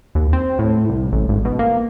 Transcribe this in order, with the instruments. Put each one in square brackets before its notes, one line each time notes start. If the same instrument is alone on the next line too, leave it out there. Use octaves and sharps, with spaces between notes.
[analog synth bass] D#2
C4
A2
C2
A1
G#1
B2
A#3